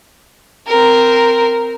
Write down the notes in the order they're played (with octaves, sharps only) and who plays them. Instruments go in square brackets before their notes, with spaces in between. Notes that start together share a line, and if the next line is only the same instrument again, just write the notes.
[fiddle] C4 A#4